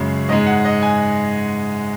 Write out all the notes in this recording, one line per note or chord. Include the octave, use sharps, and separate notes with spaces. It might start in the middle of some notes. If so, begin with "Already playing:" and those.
Already playing: F#2 C#3 G#3 C#5
G#2 G#3 D#5
F#5
D#5
G#5